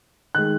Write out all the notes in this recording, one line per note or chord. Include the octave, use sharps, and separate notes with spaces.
D#3 G#3 F#6